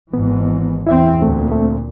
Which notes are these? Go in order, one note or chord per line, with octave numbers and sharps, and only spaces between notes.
G#1 G#2 E3 B3
E2 C4 E4 E5
D2 A#2 A3 C4
A3 C4